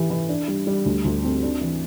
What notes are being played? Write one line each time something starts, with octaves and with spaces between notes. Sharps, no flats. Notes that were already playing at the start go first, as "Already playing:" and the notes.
Already playing: E3 G4
E3
D4
G3
G3
D2
D2
C4
D4
E3